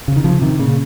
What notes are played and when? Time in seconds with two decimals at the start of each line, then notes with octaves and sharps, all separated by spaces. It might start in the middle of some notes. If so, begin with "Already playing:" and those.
0.08 C#3
0.16 D#3
0.24 C#3 F3
0.42 C3 D#3
0.60 A#2 C#3